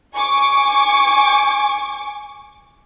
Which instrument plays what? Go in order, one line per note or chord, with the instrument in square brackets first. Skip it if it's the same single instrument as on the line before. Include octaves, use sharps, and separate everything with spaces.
[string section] G#5 C#6 D6